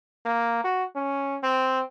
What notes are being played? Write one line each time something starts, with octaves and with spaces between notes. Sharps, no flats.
A#3
F#4
C#4
C4